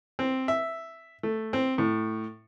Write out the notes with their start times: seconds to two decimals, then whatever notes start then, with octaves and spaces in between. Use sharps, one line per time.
0.19 C4
0.48 E5
1.23 A3
1.53 C4
1.78 A2